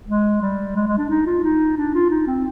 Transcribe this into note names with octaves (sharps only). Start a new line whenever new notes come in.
G#3
G3
G#3
G#3
D4
D#4
F4
D#4
D4
F4
D#4
C4